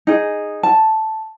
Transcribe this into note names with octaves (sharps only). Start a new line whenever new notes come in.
D#4 G#4
A5